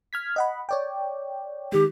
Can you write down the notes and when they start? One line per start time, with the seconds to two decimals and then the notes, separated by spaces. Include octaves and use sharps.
0.13 F6 G#6 B6
0.36 D#5 F#5 B5
0.69 C#5 D5 G5
1.72 D#3 G#3 G4